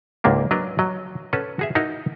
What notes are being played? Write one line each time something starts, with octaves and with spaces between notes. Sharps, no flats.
C#2 G#2 A#3 D4
F#3 D4 A#4 B4 D#5
F#3 D#5
C#4 A4 B4 F#5
F#4 G#4 E5
D#4 E4 F#4 A#4 D#5